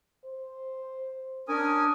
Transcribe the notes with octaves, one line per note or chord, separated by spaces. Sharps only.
C5
C#4 D4 A#4 G#5 D#6